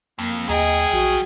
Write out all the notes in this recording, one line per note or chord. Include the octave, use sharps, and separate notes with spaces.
F2 A#3
D#2 F#3 G#4 D#5 G5
A#1 F#4